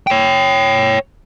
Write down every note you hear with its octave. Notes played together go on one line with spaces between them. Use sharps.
C#5 G5